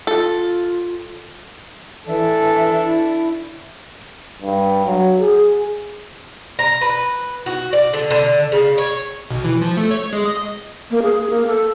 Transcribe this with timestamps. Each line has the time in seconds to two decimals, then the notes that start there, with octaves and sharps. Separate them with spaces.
0.07 F4 A4
2.07 E3 D4 A4 E5
2.82 E4
4.42 G2
4.86 F#3
5.20 G#4
6.59 A#5
6.81 B4
7.46 F#4
7.73 D5
7.93 D3
8.11 D3
8.52 C#3
8.78 C#5
9.31 B1
9.45 E3
9.62 F3
9.77 A3
9.91 C#5
10.13 G#3
10.26 D#5
10.91 A#3
11.03 G#4
11.30 A#3
11.48 A4